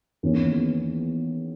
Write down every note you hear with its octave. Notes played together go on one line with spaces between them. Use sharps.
E2 D#3 A#3 C#4